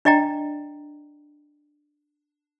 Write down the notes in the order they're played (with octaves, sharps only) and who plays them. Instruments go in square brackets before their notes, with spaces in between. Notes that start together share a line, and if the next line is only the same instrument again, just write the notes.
[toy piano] D4 D5 D#5 G5 A#5